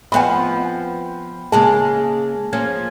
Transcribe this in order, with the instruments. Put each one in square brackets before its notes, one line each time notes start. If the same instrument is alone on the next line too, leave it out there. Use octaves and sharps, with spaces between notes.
[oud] F3 B3 C4 [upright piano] G5 B5
[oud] C#3 G#3 A#3 [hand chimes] G#4 [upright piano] A5
[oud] F3 A#3 C#4 [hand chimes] G#6